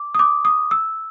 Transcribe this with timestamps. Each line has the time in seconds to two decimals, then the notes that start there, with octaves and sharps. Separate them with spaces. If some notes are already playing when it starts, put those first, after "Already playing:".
Already playing: D6
0.15 D#6
0.19 D6
0.45 D#6
0.71 E6